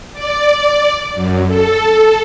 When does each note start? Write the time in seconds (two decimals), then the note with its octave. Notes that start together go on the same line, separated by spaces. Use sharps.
0.13 D5
1.15 F#2
1.47 A4